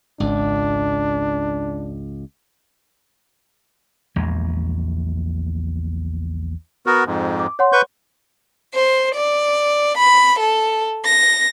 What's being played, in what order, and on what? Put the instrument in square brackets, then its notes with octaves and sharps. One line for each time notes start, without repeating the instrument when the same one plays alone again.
[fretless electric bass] G#1 [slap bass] C#2 [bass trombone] D4
[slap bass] A#1 E2 G#3
[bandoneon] B3 F#4 A#4
F2 G#2
[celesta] D6
C#5 F#5 C6
[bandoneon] B4 C#6 G6
[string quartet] C5
D5
B5
A4
A#6